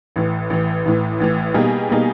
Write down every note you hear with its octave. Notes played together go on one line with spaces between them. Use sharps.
A1 A2 E3
A1 A2 E3
A1 A2 E3
A1 A2 E3
B2 G3 A#3 D#4 G#4
B2 G3 A#3 D#4 G#4